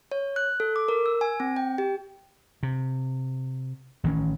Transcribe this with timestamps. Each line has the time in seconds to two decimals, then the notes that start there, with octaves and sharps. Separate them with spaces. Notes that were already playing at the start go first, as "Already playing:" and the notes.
0.12 C#5
0.36 F#6
0.60 A4
0.76 D6
0.88 A#4
1.06 E6
1.21 G#5
1.40 C4
1.56 G5
1.78 G4
2.63 C3
4.04 A1 D#3 F#3 C#4